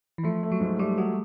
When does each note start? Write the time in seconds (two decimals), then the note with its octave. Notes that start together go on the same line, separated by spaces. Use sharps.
0.18 E3
0.23 F3 A3
0.43 A3
0.52 F#3
0.60 G#2
0.79 G3 A3
0.98 F#3 G#3